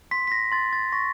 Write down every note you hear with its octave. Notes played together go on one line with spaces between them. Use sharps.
C6 B6
B6
A#6
C6 A6
A6
C#6 A#6